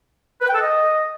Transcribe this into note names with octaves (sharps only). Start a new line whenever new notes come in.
B4
G5
A4
D#5